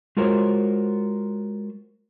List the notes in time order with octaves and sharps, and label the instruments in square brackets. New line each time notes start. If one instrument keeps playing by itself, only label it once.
[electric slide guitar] G#3 F4 F#4 A#4 C5 C#5